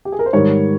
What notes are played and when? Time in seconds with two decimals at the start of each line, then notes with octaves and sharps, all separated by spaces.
0.05 G4
0.12 G#4
0.19 A#4
0.26 C5
0.33 G#2 D#3 G3 C#5